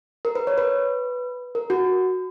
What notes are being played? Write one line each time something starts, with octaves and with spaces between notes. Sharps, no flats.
A#4
B4
C#5
B4
A#4
F#4